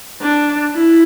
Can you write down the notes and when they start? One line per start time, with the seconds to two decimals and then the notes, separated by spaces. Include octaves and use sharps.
0.21 D4
0.75 E4